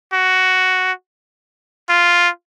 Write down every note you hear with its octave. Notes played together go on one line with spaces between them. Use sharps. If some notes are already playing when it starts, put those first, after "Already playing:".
F#4
F4